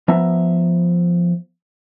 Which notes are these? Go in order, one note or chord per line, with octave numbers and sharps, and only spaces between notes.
F3 B3 E5 A#5